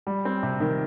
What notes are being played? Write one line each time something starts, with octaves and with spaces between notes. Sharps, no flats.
G3
C4
C3
D#3